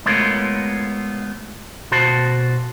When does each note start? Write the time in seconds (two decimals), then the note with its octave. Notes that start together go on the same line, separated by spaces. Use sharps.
0.06 G#3 A3 B3 F4 A#4 C#5
1.91 B2 F#4 C5 A5